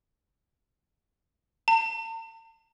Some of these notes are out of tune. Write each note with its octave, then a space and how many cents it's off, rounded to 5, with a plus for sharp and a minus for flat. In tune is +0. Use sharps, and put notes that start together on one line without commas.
A5 +45